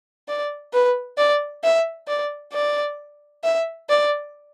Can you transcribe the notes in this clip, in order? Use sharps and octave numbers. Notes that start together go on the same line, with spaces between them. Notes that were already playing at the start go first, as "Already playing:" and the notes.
D5
B4
D5
E5
D5
D5
E5
D5